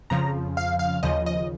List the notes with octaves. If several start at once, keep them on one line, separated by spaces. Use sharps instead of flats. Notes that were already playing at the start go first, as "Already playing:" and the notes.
F2 C#3 F3 A#5
F5
F5
D#2 C#3 F3 D#5
D#5